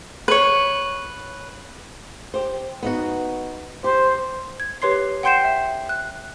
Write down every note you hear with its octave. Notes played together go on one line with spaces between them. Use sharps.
B4 C#5
G4 C5
B3 D#4 F#4
G4 C5
G#6
G4 B4 C#5 C6 C7
F#5 G5 C6 G6 C7 E7
E5
F#6